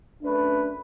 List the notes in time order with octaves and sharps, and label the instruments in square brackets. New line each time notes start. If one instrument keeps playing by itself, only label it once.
[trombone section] F#2 A3 B4 [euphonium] D4